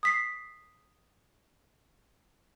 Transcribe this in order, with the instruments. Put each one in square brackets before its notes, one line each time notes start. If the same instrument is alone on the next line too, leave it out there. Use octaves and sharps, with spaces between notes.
[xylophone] D#6 B6 C7